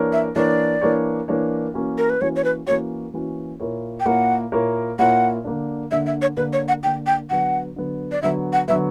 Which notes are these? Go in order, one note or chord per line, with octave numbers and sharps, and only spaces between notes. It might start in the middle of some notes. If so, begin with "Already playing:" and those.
Already playing: E3 A#3 D4 A#4 C#5
E5
E3 A#3 D4 A#4 C#5 D5
E3 A#3 D4 A#4 C#5
E3 A#3 D4 A#4 C#5
E3 A#3 C#4 F#4
A#4
B4
E3 A#3 C#4 F#4 C#5
C#5
B4
E3 A#3 C#4 F#4 C#5
E3 A#3 C#4 F#4
A#2 A#3 E4 A#4 C#5
G5
A#2 A#3 E4 A#4 C#5 F#5
A#2 A#3 E4 A#4 C#5
A#2 A#3 E4 A#4 C#5 F#5
D3 A#3 D4
D3 A#3 D4 E5
E5
C#5
D3 A#3 D4 B4
C#5
F#5
D3 A#3 D4 G5
G5
D3 F#3 B3 F#5
D3 F#3 B3
D5
D3 F#3 B3 E5
F#5
D3 F#3 B3 E5